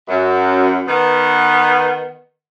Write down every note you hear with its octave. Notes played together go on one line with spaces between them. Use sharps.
F#2
D#3 B3